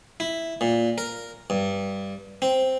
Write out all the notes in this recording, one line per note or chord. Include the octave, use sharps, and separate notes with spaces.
E4
A#2
A#4
G2
C4